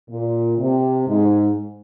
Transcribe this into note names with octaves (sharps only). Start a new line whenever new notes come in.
A#2
C3
G#2